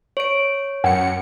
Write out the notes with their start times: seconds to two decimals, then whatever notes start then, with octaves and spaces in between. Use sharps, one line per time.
0.17 C#5 D7
0.84 F#2 F#5 C#7